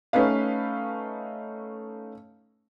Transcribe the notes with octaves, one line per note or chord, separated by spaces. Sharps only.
A3 C#4 D#4 B4 F5